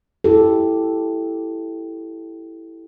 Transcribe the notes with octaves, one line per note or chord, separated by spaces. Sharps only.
E4 G4 A4